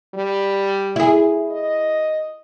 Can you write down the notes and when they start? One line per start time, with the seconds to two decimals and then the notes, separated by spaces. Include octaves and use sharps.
0.14 G3
0.96 E4 G#4
1.51 D#5